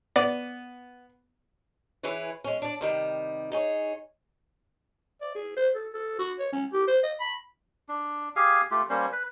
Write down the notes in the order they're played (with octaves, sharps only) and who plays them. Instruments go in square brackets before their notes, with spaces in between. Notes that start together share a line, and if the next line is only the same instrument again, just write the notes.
[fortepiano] B3 [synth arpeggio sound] D5
[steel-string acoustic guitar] E3 E4 G#4 B4 C#5
G#3 C#4
D4 D5
C3 D#3 G3
D#4 G#4 C#5
[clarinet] D5
G#4
C5
A4
A4
F#4
C#5
C#4
G4
C5
D#5
B5
[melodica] D4
G4 G#4 F5 G#5
A3 F4 G4
G3 A#3 C#4 C5
B4